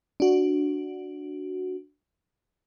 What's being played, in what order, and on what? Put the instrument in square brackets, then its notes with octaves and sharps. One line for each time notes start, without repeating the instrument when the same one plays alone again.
[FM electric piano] D4 F#4